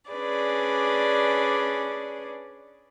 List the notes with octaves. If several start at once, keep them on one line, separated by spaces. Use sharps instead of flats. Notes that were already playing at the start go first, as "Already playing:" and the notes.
C#4 D4 G#4 B4 D5